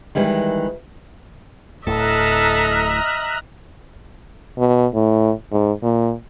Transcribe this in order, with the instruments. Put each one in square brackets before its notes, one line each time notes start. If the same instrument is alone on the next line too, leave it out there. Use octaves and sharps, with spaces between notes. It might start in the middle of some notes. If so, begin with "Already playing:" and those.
[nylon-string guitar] D#3 E3 G3 G#3
[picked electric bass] D1 A2 [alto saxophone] A4 [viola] D#5 E5 [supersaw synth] A#5 F6 F#6
[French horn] B2
A2
G#2
A#2